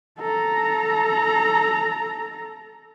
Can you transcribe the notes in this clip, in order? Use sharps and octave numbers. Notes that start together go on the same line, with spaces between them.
A4 A#5